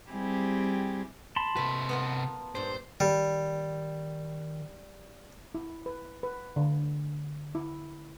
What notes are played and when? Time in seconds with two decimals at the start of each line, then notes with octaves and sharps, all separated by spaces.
0.11 G3 C4 E4 G4 G#4
1.36 A5 B5 C6
1.56 C3 A3 B4
1.89 B3 F4 A#4
2.55 G2 A#2 C5
3.00 D#3 G3
5.55 E4
5.86 B4
6.23 B4
6.56 D3
7.55 E4